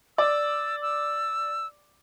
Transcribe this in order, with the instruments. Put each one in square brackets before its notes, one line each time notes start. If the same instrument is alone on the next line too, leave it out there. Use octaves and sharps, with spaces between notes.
[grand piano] D5 [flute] E6
[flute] E6